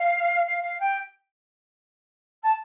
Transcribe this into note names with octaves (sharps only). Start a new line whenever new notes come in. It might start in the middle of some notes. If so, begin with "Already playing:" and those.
Already playing: F5
F5
F5
G5
A5